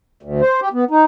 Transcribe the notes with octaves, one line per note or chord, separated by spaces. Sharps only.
D2
C5
G4
B3
D#4